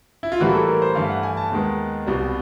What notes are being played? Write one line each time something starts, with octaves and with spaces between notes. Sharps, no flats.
E4
F4
A2 E3 G3 A#3 F#4
A4
A#4
C5
G2 E3 A3 F5
F#5
G#5
A5
D#2 D#3 G#3 B3
C2 B2 G3